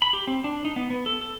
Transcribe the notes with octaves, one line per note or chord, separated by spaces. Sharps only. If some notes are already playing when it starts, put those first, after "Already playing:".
B5
G4
C4
D4
D#4
B3
B3
A4
A4